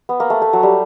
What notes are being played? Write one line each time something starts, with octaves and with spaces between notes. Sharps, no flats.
B3
A#3
A3
A3
F#3
G3